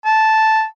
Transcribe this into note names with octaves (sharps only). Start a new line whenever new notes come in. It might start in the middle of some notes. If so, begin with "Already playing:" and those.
A5